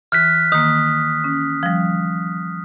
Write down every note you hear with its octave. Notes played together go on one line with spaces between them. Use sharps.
E3 F6 F#6 B6
D#3 A#3 D#6
C#4
F3 G3